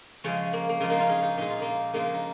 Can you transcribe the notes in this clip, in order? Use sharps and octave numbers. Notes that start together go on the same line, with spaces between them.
C#3 F3 G#3 C#4
A#3
A#3
C#3 F3 G#3 C#4
A#3 D#4
C#4 F4
D#4 G#4
D#4 G#4
A#2 G#3 D#4
F4
A#3 D#4
C#3 F3 G#3 A#3 D#4
D#4